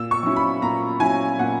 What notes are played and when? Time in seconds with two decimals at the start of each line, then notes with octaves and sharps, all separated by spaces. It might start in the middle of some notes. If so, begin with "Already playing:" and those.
Already playing: A#2 E6
0.11 C#6
0.23 F#3 C#4 E4
0.36 B5
0.62 A#2 A#5
1.00 F#3 C#4 E4 G#5
1.39 A#2 F#5